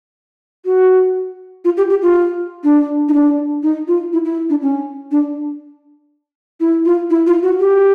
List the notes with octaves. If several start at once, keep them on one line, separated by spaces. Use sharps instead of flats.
F#4
F4
G4
G4
F4
D4
D#4
D4
D#4
F4
E4
E4
D4
C#4
D4
E4
F4
E4
F4
F#4
G4